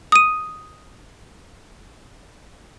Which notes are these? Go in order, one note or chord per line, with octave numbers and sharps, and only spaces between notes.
D#6 D#7